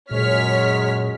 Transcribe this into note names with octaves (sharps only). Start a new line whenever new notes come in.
F#2 A#2 G#3 C#5 F6 B6